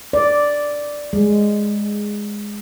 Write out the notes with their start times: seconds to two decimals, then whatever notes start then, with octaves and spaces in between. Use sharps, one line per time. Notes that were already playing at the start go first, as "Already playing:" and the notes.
0.13 D5
1.13 G#3